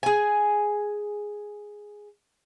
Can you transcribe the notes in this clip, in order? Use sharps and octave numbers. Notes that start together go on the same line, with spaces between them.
G#4 G#5